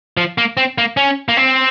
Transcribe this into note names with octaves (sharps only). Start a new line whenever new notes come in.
F3
A#3
C4
A#3
C#4
A#3
C4